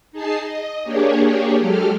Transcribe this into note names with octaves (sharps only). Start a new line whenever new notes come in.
D#4 G#4 A5 C7
D#5
A#3 D4 G4 G#4 C#5
F#3 G#3 G4 A4 F6